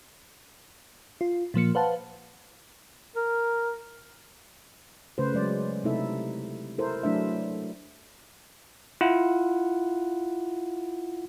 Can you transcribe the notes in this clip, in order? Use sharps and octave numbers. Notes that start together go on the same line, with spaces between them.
F4
A#2 F3 A#3 C#7
B4 C5 F5 F#5 A5
A#4
C#3 A3 B4 C5
F#3 G#3 D5
C3 A3 D#4 E4 A4 E5
E4 A4 A#4 C5
F#3 A3 D4 E4 E5
E4 F4 F#5